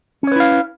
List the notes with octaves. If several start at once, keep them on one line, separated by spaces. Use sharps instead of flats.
C#4 E4 B4 C#5 F5